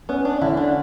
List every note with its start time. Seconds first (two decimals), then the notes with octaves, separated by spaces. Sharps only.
0.09 B3 C#4
0.25 D4
0.41 D3 E4
0.57 D4